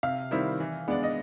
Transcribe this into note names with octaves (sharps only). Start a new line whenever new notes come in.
C3 F5
D#3 G3 C4 E4
E3
G#3 B3 D4 D5
D#5